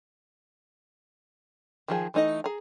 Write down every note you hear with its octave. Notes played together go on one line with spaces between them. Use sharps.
D#3 F3 G#4
E3 A3 D#4 F#4 D#5
G#4 A#5